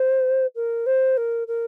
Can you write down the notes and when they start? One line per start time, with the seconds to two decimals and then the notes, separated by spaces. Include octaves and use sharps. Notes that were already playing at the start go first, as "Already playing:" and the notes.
Already playing: C5
0.55 A#4
0.86 C5
1.17 A#4
1.47 A#4